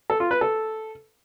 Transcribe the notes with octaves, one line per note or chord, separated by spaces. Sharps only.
A4
F4
B4
A4